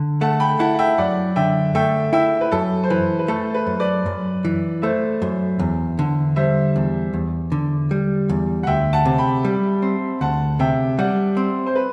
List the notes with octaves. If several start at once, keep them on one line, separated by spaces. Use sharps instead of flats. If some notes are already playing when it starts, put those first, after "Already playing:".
Already playing: D3
A3 F#5 A5
G5 B5
E4 F#5 A5
F#5
E5 G5
F#2 D5 F#5
D3 E5 G5
A3 E5 G5
E4 E5 G5
B4
F#2 A4
C5
E3 B4
B4
A3 A4
B4
F#2
B4 D5
F#2
E3
A3 C5 E5
F#2
E2
D3
G3 C5 E5
E2
E2
D3
G3
E2
F#5
D2 E5 G5
F#5 A5
C3
G5 B5
G3
C4
D2 F#5 A5
C3 E5 G5
G3 D5 F#5
C4
C5
B4